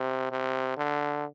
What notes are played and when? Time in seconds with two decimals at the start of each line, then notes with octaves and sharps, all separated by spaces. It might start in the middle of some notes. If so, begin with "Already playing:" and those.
Already playing: C3
0.31 C3
0.77 D3